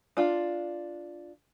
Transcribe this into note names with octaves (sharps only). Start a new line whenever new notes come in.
D4 F4